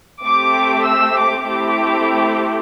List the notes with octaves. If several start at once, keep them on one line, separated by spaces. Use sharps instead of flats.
A3 C4 G4 D6
E6
D6
A3 C4 E4 G4 D6